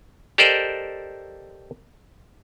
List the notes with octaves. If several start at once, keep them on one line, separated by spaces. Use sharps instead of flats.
G4 A4 A#4 C5 D5 D#5